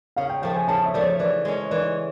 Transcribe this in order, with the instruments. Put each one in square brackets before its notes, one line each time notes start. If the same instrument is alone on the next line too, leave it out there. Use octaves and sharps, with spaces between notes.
[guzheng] C#3 [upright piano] F5
[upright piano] G5
[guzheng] F3 A3 [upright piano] G5
[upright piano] G#5
[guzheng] C#3 [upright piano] A5
[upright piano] E5
[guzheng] F3 A3 [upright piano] D5
[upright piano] C#5
[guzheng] E3 [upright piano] D5
[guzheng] G#3 C#4
[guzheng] E3 [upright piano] D5